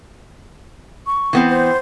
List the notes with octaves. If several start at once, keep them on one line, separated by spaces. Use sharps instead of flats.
C#6
E3 B3 C4
C5